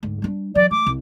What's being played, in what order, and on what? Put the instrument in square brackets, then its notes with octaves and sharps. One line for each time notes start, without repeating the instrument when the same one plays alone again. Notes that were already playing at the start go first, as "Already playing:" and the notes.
[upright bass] D2 G#2
G3 D4
[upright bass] E3 F#3 [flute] D5
[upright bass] A3 [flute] D6
[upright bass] C2